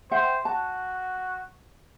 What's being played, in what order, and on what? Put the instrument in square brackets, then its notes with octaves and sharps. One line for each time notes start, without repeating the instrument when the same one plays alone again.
[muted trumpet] C5 [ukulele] E5 F#5 G5
[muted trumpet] F#4 [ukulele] A5